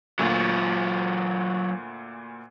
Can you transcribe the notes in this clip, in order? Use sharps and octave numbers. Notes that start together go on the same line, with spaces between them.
D2 A#2 F#3 F4